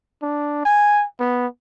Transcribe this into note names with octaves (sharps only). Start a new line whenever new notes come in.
D4
G#5
B3